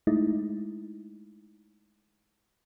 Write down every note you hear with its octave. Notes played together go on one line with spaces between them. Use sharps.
G#3 A3 D#4 E4